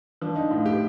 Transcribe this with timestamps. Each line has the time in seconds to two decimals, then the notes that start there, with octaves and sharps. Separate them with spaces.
0.21 F3 D4
0.36 D#4
0.51 A2 F4
0.66 G4